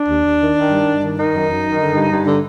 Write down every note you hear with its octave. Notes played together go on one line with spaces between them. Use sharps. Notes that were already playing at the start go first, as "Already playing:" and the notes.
Already playing: D4
D#2
D#2
D#3
D#3
G2
G2
D#3
D#3 D#4
F#2
F#2
D#3
D3
G2
G2
D3